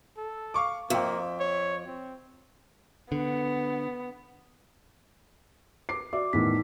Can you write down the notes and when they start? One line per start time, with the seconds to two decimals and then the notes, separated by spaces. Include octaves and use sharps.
0.17 A4
0.54 F5 C#6 D6
0.90 F2 A#3 E5 G5
1.40 C#5
1.86 C4
3.12 D3 B3
5.89 D6 C7
6.13 F#4 D5 E5 D6
6.33 E2 A2 D#3 D#4 B6